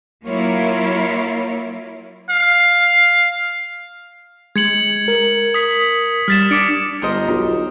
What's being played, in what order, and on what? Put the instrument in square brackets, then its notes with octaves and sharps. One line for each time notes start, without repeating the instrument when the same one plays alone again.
[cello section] F#3 A#3 E4 F4 A#4 C#5
[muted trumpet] F5
[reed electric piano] G#3 [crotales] G#6 C#7 F#7
[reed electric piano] A#4
[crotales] D#6 B6
[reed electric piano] G3 A6 [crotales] F6 B6 E7
[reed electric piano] D4 [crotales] D6 C#7 D7
[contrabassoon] G1 [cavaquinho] A#4 C5 D#5
[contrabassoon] B1 [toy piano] F4 G4